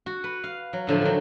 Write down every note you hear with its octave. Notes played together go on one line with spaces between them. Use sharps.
F#4
B4
F5
F#3
A2 D3 F3 A3
D#3 F#3